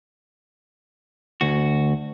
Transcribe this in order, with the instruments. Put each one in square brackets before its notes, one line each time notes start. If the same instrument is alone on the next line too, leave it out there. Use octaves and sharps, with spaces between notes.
[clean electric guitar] D2 F#4